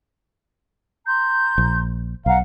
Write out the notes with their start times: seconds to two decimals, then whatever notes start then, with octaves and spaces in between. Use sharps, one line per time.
1.06 A#5 C6 G6
1.58 A#1
2.26 B1 F5 F#5 A#5